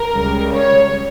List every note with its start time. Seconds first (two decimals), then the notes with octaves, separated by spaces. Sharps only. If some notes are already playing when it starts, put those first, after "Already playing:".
Already playing: A#4
0.12 C#2 C#3 G3
0.52 C#5